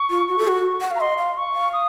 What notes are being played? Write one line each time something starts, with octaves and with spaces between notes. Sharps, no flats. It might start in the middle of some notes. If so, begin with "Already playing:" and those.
Already playing: C#6
F4
F#4
A4
F#4
F#5
F5
A#5
D#5 C6
F5
C#6
F5
D#6